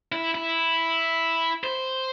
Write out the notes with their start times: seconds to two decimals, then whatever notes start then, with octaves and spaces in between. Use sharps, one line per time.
0.12 E4
0.34 E4
1.64 C5